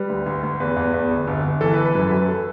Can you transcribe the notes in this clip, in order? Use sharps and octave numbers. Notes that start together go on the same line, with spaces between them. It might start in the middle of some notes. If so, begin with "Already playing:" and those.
Already playing: G3 B4
D2
D2
D2
E2 B4
E2
E2
G1
G1
G1
E3 A4
B4
E3
B4
F#2 A4
F#3 B4
A4